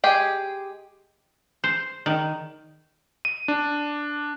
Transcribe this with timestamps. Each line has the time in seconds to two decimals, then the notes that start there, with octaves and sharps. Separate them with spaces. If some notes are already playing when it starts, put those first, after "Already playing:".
0.04 G#3 G4 G#4
1.64 C5
2.06 D#3
3.25 D#7
3.48 D4